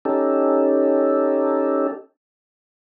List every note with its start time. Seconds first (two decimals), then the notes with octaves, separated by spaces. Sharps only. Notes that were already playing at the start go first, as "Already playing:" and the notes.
0.05 C#4 D#4 G4 A4